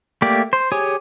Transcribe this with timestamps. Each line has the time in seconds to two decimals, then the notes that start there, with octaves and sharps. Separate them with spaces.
0.22 A3 A#3 G4 D5
0.53 C5
0.72 G4 G#4 C#5 G#5 D#6